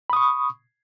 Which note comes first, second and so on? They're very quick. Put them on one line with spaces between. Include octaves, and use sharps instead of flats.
B5 D#6 C#6